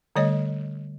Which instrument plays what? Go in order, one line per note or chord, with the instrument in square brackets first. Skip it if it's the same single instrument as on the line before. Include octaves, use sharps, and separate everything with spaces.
[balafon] D3 G3 A3 C#5 D#5